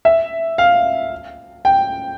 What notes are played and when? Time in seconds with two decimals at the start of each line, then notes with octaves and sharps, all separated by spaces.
0.05 E5
0.58 F5
1.65 G5